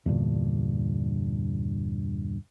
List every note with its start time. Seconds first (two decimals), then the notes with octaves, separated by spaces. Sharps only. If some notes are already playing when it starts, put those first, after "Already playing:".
0.06 E2 G2 A#2 D3